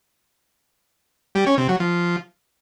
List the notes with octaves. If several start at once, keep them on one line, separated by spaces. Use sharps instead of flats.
G3
C#4
C3
F#3
F3